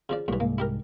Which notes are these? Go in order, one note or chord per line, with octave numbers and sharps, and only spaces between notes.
C#3 F3 D5
B1 A2 E3 G3
C2 G#2 A#3
E4 G4 A#4